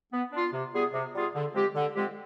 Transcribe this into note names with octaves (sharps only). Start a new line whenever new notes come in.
B3
D4 F4
C3
G3 B3 F4 G#4
C3
G3 B3 F4 G#4
D3
F3 G#3 C4 G4
D3
F3 G#3 C4 G4